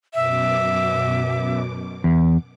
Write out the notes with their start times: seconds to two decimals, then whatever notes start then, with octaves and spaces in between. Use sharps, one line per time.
0.14 F#2 B2 E5 D6
2.04 E2